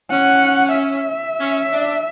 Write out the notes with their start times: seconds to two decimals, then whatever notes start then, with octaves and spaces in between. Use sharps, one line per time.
0.11 C#4 F#5
0.75 E5
1.40 C#4
1.73 D4